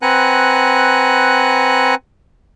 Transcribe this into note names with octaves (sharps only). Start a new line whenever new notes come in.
C4 B4 F#5 G#5 A#5 F#6